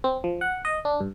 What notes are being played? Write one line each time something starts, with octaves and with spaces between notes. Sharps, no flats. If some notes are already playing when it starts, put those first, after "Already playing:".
C4
F3
F#5
D#5
D4
G2